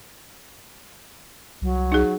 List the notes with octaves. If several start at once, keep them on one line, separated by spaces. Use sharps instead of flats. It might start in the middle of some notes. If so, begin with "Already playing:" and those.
C2 F#3
D#4 G#4